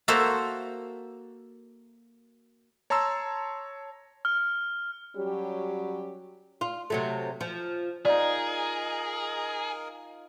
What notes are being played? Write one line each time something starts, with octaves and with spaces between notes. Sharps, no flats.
A#3 F#4 A4 C5 E5 A#5
C#5 A5 A#5 C6 E6
F6
F#3 G3 C#4 F#4 G4
F4
C3 F#3 A3
F3
D#4 F4 G#4 A#4 D5 D#5